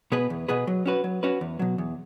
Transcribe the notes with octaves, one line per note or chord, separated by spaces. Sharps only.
B2 B3 G#4 B4
E2
B2 B3 G#4 B4
F#3
C#4 F#4 B4
F#3
C#4 F#4 B4
E2
B2 F#3
E2